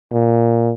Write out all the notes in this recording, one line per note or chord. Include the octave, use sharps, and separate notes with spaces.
A#2